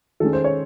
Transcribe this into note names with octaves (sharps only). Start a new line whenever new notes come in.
D#3 G#3 C#4 A4
C5
C#5